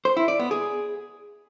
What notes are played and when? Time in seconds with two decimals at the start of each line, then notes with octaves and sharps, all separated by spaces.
0.05 C5
0.17 E4
0.28 D5
0.39 B3
0.51 G#4